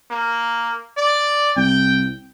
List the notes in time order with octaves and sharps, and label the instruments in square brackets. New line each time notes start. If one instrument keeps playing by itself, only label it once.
[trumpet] A#3
D5
[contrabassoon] C2 [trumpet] G5